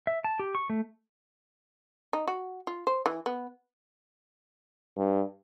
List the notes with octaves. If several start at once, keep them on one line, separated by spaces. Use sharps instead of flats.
E5
A5
G4
C#6
A3
D#4
F#4
F4
C5
E3
B3
G2